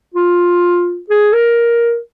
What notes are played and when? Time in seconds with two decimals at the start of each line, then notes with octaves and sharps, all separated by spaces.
0.14 F4
1.10 G#4
1.33 A#4